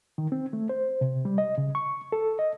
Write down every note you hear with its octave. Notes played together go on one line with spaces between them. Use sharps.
D#3
C4
A3
C5
C3
G3
D#5
C#3
C#6
A4
D#5